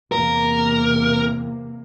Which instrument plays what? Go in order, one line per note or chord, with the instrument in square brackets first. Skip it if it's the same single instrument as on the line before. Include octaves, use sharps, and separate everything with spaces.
[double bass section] E2 C3 A#3 [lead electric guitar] A#4